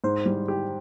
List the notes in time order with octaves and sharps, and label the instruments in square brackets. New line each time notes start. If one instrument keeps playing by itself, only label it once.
[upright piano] G#2 [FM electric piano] C5
[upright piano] G3
G4